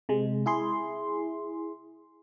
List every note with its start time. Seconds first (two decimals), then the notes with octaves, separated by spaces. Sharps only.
0.09 C3 G#3
0.46 E4 G#4 C6